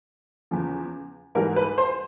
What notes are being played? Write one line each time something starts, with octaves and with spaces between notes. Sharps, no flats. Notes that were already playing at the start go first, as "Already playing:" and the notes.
E2 C#3 F3
G#2 E3 G3 A#4
B4
C5